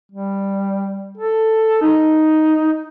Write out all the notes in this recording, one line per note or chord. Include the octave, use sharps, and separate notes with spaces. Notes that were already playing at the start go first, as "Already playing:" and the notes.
G3
A4
D#4